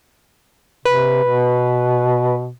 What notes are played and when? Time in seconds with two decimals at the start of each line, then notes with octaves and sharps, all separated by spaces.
0.85 C3 B4
1.23 B2